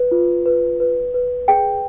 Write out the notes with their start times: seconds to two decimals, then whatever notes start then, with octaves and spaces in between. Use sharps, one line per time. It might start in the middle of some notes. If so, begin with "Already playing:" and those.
Already playing: B4
0.11 F4
0.46 B4
0.80 B4
1.14 B4
1.48 G#4 G5